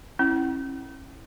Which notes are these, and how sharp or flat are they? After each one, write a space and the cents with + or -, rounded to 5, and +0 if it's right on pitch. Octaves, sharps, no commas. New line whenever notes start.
C#4 -35 E4 +0